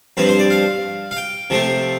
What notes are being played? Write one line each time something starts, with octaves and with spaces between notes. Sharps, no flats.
G2 F3 C4 B4
C5
D5
F5
F5
G5
C3 F3 A3 C4